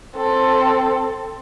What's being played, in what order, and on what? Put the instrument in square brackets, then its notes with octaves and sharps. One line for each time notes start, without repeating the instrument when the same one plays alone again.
[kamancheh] C4 A4